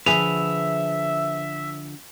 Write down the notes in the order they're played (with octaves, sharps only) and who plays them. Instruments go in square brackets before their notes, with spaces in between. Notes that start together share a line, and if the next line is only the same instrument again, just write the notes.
[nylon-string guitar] D3 F3 [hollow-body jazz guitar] G#4 B4 [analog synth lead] E5 [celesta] F7